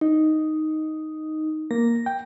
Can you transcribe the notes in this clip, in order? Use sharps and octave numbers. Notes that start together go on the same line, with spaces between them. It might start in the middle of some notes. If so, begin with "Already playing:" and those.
D#4
A#3 A#6
G5